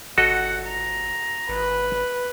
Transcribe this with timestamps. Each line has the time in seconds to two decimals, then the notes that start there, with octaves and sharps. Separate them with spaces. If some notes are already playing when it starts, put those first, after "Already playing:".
0.18 G1 F#4 A4 D#5 F#5
0.67 A#5
1.49 G#1 B4